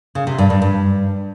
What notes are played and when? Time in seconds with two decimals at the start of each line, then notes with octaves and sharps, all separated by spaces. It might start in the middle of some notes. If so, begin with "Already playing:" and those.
0.15 C#3
0.27 C3
0.38 G2
0.50 G2
0.62 G2